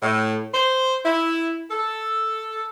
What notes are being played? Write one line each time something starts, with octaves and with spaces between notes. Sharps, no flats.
A2
C5
E4
A4